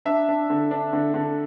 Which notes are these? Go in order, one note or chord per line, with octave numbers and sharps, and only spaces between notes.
D4 E5
D4
D3
D4
D3
D3